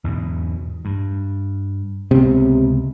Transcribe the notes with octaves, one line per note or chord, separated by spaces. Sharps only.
E2 G#2 B2
G2
C#2 C3 G#3 B3